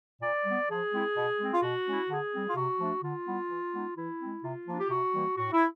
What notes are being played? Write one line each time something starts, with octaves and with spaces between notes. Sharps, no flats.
A#2 D5
G3 B3
F3 G#4
G#3 C4 E4
B2
G#3 C4
F4
B2 F#4
G#3 C#4 E4
D3 G#4
G3 C4
F4
C3 F#4
F3 A3 D4
D3 F4
G3 B3 E4
E3
G#3 B3 D#4
E3 E4
G#3 C4
C3 F4
F3 A#3 D4
G4
C3 F#4
E3 G3 A#3
A2 F#4
E4